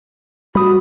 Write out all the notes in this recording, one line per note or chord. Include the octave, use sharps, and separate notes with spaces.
G3 F#4 B5 D#6